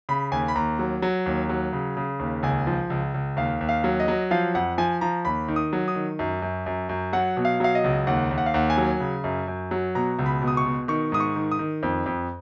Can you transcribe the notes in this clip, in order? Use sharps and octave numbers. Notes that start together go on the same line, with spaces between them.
C#3 B5
D#2 G#5
B5
D#2 A#5
F#3
F#3
D#2
F#3
C#3
C#3
D#2
C#2 G#5
F3
C#2
C#2
D#2 F5
D#2
F5
F#3
D#5
F#3
F3 F5
F2 F#5
F3 G#5
F3 A#5
D#2 B5
D#3
D#6
F#3
D#6
D#3
F#2
F#2
F#2
F#2
F#3 F#5
B2
F5
F#3 F5
D#5
C#2
D#2 F#5
D#2
F#5
F5
D#2 F#5
G#5
F#3
C#3
F#2
F#2
F#3
B2 A#5
C#2
B5
B2
D#6
C#6
B2
D#3 C#6
G#2 D#6
C#6
D#3
D#6
D#3
F2
F2